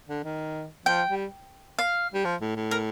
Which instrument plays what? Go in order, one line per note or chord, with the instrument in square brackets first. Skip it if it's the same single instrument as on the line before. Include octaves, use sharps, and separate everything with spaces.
[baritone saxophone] D3
D#3
[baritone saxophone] F3 [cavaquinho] G5
[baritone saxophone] G3
[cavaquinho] F5
[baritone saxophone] G3
F3
A2
A2
[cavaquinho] A#4